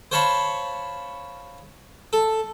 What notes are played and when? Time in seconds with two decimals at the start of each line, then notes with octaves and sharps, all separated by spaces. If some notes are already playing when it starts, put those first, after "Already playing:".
0.12 C5 C#5 F5 A5 B5 C#6
2.13 A4